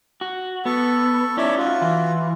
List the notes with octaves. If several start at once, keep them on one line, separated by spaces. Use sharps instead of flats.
F#4
B3 A4 C#6
C#4 D#4 E4 C#5 D5 E5
F4 F#4
E3